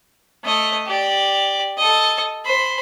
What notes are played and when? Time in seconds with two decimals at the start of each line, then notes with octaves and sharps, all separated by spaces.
0.44 A3 D#5
0.86 G4 D5
1.78 A4 D#5
2.45 C5 B5